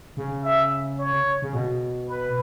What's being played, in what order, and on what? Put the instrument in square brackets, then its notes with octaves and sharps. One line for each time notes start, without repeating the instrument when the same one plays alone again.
[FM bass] C#3
[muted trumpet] E5
C#5
[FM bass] C#3
B2
[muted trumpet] B4